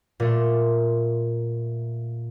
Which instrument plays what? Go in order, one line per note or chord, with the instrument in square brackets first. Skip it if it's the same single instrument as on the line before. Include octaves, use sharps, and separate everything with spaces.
[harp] A#2 A3 C6